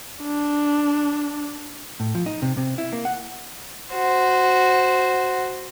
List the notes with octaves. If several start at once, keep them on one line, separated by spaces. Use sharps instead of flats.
D4
A2
F3
D#4
C3
C3
E4
A#3
F#5
F#4 C5